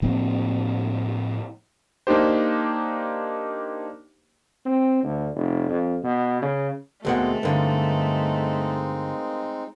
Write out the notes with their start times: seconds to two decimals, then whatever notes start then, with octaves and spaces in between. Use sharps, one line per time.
0.02 A2 F3 A#3 C4
2.07 A#3 D4 D#4 G4 C5
4.65 C4
5.03 D2
5.34 F1
5.69 F2
6.03 B2
6.42 C#3
7.05 D#2 B2 G#3 A3 C4 G#4 A#4 F#5
7.43 G2 D3 G#3 C4 D#4 A#4 B4 F5